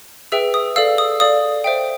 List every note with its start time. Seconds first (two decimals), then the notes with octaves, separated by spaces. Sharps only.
0.32 G#4 B4 E5 G5 E6
0.54 D#6
0.76 A4 D5 F5 E6
0.98 D#6
1.20 A4 D5 F5 D#6
1.64 C5 E5 G5